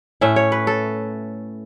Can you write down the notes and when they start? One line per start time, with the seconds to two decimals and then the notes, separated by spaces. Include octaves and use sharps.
0.21 A2 A3 C#4 E5
0.36 C#5
0.52 B4
0.67 A4